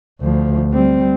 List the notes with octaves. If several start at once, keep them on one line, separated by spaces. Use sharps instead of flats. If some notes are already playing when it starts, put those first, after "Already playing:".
D2 F3
G3 C4